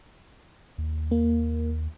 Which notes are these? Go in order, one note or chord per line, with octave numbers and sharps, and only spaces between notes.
D#2
A#3